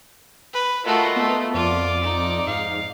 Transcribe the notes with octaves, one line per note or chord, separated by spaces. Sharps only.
B4
A3 F4 F#4 A#4 D#5
A3 B3
F2 F4 D5 D6
D#4
G#2 F5